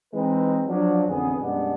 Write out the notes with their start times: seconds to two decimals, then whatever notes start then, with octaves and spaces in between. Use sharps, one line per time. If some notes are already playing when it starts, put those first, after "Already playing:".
0.14 E3 G#3 C4 D#4 B4
0.67 F3 F#3 D4
1.08 A1 F2 D3 B3 G#4
1.39 F#2 B2 G3 G#3 B3 D4